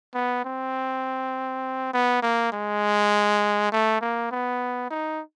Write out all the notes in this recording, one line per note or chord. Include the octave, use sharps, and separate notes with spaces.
B3
C4
B3
A#3
G#3
A3
A#3
B3
D#4